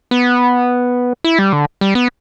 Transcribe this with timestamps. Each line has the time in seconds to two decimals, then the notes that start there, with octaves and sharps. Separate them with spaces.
0.11 B3
1.24 E4
1.39 G3
1.53 D3
1.81 G3
1.95 B3